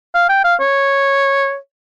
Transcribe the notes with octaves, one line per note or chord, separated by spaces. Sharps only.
F5
G5
F5
C#5